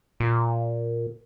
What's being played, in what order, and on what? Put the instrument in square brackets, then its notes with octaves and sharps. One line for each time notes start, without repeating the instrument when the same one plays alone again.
[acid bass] A#2